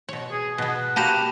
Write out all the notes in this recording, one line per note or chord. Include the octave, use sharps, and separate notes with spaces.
B2 C#5
G#4
B2 B3 F#5
A#3 F#4 G4 A5 B5 E7